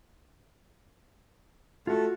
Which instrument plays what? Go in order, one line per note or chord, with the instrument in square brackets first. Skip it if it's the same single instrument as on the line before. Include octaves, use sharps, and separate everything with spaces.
[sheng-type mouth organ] A3 [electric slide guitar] F4 F#4